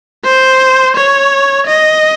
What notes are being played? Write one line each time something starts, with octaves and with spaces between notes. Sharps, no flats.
C5
C#5
D#5